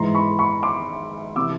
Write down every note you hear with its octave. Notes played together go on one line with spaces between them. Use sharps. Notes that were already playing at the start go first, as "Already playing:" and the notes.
Already playing: G#2 E3 G#3 A#5 C6
B5 C#6
B5 C#6
C6 D6
C3 E3 D6 E6